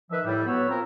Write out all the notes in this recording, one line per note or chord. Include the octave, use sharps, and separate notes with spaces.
D#3 F3 B4 E5
A2 G3
F#3 B3 B4 C#5 B5 E6
F3 C4 F4 A#4